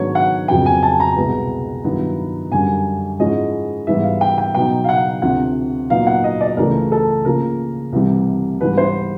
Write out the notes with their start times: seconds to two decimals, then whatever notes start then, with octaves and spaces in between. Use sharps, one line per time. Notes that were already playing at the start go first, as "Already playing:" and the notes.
Already playing: G#2 D#3 F#3 B3 D4 C#5
0.15 F#5
0.48 F2 C#3 F#3 B3 G5
0.66 G#5
0.83 A5
1.00 A#5
1.16 C2 B2 G#3 B3
1.84 G2 D#3 F#3 B3 E4
2.52 F#2 D3 G3 G#5
3.19 G#2 F3 G#3 C#4 E4 D#5
3.87 G#2 E3 G3 B3 E4 E5
4.04 F5
4.21 G5
4.38 G5
4.55 B2 F#3 B3 D#4 G5
4.84 F5
4.89 F#5
5.22 D2 C3 F3 F#5
5.90 A#2 F#3 B3 D#4 F5
6.07 F#5
6.24 D#5
6.41 D5
6.57 C#2 C#3 E3 A3 A#4
6.92 A4
7.25 C#3 F3 A#3 A#4
7.93 C2 C3 E3 G3
8.60 G#2 E3 G3 B3 B4
8.78 C5